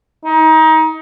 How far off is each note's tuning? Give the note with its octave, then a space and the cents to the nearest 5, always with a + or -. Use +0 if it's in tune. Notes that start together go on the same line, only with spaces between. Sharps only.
D#4 +25